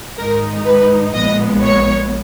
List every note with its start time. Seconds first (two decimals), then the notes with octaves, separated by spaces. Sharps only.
0.18 G#2 D#3 G#3 D#4 A#4
0.66 B4
1.14 A#1 A#2 G#3 B3 D#5
1.63 C#5